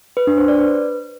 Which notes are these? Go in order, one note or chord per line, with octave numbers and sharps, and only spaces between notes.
B4
D4
C5
D5
B4